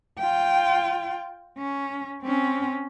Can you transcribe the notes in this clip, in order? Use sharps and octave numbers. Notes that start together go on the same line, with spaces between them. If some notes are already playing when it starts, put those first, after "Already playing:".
F4 G5
C#4
C4 C#4